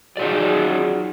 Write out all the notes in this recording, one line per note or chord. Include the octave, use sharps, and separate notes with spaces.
F#3 D#4 F4 G#4 D5